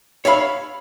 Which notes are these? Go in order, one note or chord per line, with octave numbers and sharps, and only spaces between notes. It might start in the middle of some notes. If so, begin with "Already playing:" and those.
C#5 E5 F5 B5